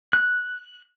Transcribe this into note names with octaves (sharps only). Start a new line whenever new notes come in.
F#6